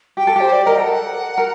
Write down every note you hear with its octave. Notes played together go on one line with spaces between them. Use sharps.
G4 G5
A4
G4 C5
D5
A#4 D#5
A4 F#5 G5
A#4